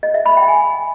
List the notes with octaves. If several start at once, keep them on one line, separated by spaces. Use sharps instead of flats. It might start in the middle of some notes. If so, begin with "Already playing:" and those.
D#5
E5
B5
G5
G#5